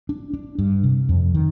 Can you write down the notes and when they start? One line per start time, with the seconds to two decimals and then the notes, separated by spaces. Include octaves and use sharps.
0.09 D4
0.33 D4
0.58 G2
0.84 C3
1.09 F2
1.35 D#3